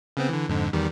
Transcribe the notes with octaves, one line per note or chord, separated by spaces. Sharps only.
C#3 B3 C4
D3 E3
F2 G#2 D3
E2 D#3 G3